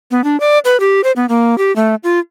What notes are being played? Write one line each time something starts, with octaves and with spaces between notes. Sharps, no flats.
B3
D4
D5
B4
G4
C5
B3
A#3
G4
A3
F4